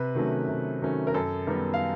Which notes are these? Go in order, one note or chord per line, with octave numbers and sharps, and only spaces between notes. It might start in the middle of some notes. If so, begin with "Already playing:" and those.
Already playing: C3 B4
D#3 F#3 A3 C#4
C3
D#3 F#3 A3 C#4
A#4
F#2 A4
D#3 G3 B3 A#4
F5